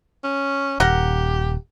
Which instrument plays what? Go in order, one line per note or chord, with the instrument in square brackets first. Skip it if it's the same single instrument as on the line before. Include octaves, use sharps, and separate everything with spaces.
[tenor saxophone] C#4
[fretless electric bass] D#1 [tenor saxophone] G4 [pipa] A#4 F#5